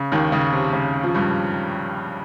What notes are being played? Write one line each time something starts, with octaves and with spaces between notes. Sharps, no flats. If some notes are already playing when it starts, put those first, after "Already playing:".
Already playing: C#3
D#2 D#3
C#3
C3
C#3
F3
G2 G3